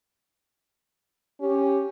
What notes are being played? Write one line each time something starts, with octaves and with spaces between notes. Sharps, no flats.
C#4 G4